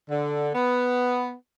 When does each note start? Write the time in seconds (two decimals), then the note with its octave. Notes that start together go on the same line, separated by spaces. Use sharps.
0.10 D3
0.55 B3